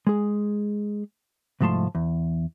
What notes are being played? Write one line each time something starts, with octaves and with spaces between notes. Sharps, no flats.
G#3 G#4
C2 G#2 F3 A3 A5 C6
E2